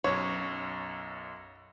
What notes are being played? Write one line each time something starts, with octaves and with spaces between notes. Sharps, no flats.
B1 F#2 C#5